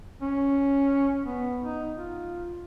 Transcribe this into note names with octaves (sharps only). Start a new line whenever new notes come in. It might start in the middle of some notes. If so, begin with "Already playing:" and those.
C#4
B3
D#4
F4